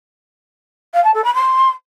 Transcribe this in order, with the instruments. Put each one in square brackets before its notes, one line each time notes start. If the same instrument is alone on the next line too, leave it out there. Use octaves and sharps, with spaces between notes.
[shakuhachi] F5
A5
A4
B5
C6